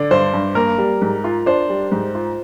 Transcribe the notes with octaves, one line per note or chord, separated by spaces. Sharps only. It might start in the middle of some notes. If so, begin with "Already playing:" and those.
Already playing: D3 D5
G2 C5
G2
A#3 A#4
G3
G#2
F4
D4 C5
G3
G#2
F4